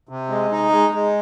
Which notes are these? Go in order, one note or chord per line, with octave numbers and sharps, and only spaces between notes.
C3
G#3
D#4
G#3
G#3